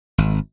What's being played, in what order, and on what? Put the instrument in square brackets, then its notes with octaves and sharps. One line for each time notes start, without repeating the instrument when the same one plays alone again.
[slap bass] G#1